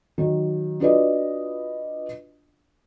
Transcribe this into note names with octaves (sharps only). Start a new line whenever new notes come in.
D#3 F#3
D4 F4 F#4 B4 D5 D#5